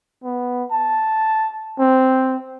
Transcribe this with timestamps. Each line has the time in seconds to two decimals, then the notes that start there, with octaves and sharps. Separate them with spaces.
0.24 B3
0.71 A5
1.79 C4